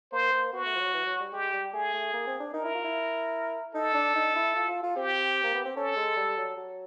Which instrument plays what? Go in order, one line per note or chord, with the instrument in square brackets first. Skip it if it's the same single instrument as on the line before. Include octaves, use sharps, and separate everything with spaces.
[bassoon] A#3 [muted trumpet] C5
[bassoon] A#3
[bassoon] B3 [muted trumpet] F#4
[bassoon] A3
F3
F#3
E3
F#3
G3
[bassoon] G#3 [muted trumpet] G4
[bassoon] G3
[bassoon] A3 [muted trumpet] G#4
[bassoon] A3
A#3
C4
D4
[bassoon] D#4 [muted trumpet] A#4
[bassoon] E4
F4
E4
[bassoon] D#4 [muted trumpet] A4
[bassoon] D4
D#4
E4
F4
F4
F4
[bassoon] C4 [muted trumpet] G4
[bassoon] A#3
B3
C4
[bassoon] C#4 [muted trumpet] A4
[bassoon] G#3
G3
F#3
F#3